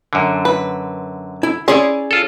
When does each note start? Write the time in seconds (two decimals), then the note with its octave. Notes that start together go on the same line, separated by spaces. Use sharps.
0.13 F#2 D3
0.45 B4
1.43 E4
1.68 C#4 E4 G#4 C#5 D5 C6
2.11 F4 A4